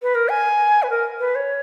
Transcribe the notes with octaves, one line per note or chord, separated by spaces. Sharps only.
B4
A#4
G#5
B4
A#4
B4
C#5